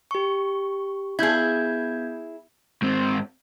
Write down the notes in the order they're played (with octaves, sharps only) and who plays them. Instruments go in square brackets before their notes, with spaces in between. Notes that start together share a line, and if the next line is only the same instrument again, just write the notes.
[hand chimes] G4 C#6
[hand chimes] B3 G6 G#6 [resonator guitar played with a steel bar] E4 G#4
[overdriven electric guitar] G#2 C4